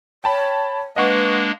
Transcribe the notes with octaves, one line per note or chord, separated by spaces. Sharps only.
C#5 G5 A5 B5
G#3 A#3 D4 B4 D#5 F#5 C#6